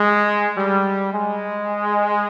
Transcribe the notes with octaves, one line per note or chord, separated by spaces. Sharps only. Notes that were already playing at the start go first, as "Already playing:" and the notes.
Already playing: G#3
G3
G#3